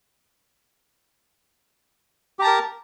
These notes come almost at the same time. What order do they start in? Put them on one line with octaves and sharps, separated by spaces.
G4 A#5 A5 A#4